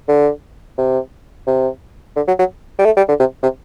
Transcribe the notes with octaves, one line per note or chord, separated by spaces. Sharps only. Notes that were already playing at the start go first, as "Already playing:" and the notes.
D3
C3
C3
D3
F#3
F#3
G3
A3
G3
D3
C3
C3